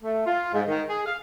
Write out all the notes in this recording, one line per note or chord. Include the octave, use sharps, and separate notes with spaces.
A3
F4
G#2
D#3
G#4
F5